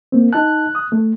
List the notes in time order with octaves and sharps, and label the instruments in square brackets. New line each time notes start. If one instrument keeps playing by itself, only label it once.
[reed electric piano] A#3 C4
[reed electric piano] D#4 A5 [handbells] F#6
[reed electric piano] D#6
A3